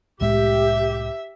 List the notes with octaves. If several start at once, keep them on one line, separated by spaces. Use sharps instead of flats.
C2 A2 G#3 G4 E5